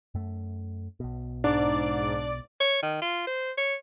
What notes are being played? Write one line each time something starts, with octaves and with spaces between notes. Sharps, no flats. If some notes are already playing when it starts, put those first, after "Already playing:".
F#2 A3
B1 B2
G#2 D4 D5
C#5
D#3
F4
C5
C#5